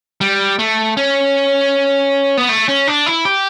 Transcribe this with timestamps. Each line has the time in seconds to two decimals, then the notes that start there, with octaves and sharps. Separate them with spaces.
0.21 G3
0.59 A3
0.97 C#4
2.37 B3
2.49 A3
2.68 C#4
2.88 D4
3.06 E4
3.25 G4